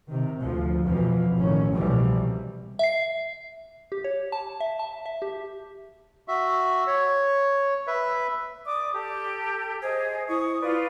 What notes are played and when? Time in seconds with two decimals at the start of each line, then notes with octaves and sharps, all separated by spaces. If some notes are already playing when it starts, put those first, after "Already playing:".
0.10 C3 D#3
0.41 D2 F3
0.87 F2 B2 E3 F3
1.39 A1 D#3 C#4
1.73 C2 B2 E3 F3 G3
2.79 E5 C7
3.92 G4
4.04 C#5
4.32 A5
4.60 E5
4.79 A5
5.06 E5
5.22 G4
6.28 F#4 E5
6.87 C#5
7.87 B4 E5
8.66 D5 D6 D#6
8.94 G4 A4
9.83 G#4 C5 D#5
10.29 E4 C#6 D#6
10.61 F4 B4 D5